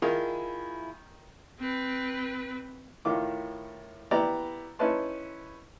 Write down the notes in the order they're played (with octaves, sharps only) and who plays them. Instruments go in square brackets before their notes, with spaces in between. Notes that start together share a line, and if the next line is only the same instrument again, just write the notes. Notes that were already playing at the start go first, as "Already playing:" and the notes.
[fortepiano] D#3 [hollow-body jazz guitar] E4 F4 G#4
[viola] C4 B4
[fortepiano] A2 D#3 F4 D6
B3 E4 G4 D5 A#5
C#4 D#4 E4 B4 A5 C6